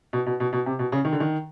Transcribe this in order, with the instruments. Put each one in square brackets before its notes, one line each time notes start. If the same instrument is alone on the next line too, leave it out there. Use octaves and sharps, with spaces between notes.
[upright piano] B2
B2
B2
B2
C3
B2
C#3
D#3
D3
D#3